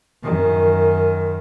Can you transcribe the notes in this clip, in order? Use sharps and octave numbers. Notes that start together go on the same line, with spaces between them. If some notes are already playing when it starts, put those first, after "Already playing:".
F#2 D#3